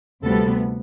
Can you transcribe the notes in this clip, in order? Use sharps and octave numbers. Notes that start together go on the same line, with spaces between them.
D2 C3 G3 B3 A4